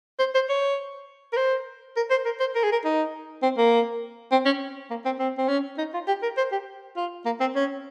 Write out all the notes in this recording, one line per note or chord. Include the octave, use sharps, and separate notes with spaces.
C5
C5
C#5
A#4
C5
A#4
C5
A#4
C5
A#4
G#4
A#4
D#4
C4
A#3
C4
C#4
A#3
C4
C4
C4
C#4
D#4
F4
G4
A#4
C5
G4
F4
A#3
C4
C#4